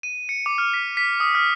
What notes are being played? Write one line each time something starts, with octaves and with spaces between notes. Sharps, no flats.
D#7
C#7
D6
F6
B6
B6
D#6
F6